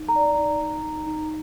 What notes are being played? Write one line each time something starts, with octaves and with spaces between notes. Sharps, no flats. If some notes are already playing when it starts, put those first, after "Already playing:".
Already playing: D#4
A#5
D5
D#4
D#4
D#4
D#4